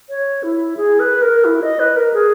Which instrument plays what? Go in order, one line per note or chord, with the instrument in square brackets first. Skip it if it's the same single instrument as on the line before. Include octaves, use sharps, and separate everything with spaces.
[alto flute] C#5
E4
G#4
B4
A#4
E4
D#5
B4
A#4
G#4